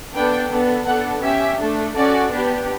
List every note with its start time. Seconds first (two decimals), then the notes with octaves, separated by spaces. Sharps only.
0.15 B3 D4 A4 G5
0.51 B3 D4 A4
0.87 B3 D4 A4 F#5
1.23 C#4 G4 E5
1.59 A3 D4 A4
1.95 C#4 F#4 A4 D5
2.32 B3 D4 G4